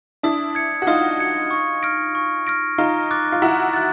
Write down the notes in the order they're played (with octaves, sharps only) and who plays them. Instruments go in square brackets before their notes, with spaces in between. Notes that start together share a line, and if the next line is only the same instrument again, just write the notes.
[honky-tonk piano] D4 E4 [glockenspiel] D#6
[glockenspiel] G#6 C#7
[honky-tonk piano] F#4
[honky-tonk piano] D#4 F4 [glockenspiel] D#6
[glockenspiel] G#6 C#7
C#6
F6 A#6 D7
C#6
F6 A#6 D7
[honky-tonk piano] D#4 F4 [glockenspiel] A#5
[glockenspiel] D6 F#6 A6
[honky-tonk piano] F4
[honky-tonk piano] E4 F#4 [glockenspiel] A#5
[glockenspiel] F#6 A6